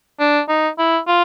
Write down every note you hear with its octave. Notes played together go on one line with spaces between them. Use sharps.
D4
D#4
E4
F4